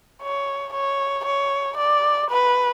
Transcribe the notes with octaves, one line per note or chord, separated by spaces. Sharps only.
C#5
C#5
C#5
D5
B4